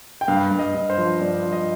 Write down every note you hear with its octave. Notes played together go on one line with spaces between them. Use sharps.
G5
G2 F5
G2
D#5
G2
C5
F3
G2 D5
F3
D#5